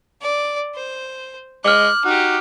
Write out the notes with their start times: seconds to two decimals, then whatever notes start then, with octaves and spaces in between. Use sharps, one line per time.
0.22 D5
0.75 C5
1.64 G#3 D6 F6 F#6
2.05 D#4 F#4 G4